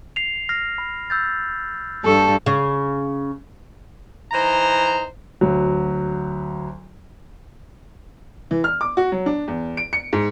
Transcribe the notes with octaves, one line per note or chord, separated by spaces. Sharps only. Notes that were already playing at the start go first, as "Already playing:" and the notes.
C7 F7
F6 A#6 C7
B5
E6 G6 A6
G2 A4 A5 C#6 E6
C#3
E3 D#4 C5 A#5
D2 F#3
E3
F6
D6
F#4
F#3
D4
E2
D7
C#7
G#2